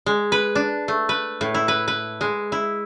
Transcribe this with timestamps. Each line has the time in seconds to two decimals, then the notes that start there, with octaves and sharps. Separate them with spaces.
0.06 G#3
0.32 B4
0.55 D4
0.88 A3
1.09 B4
1.41 A2
1.54 E4
1.68 B4
1.88 B4
2.21 G#3
2.52 E4